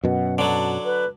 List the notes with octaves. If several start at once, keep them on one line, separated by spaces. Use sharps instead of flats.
F#2 B2 F#5
D3 F#3 A5
B4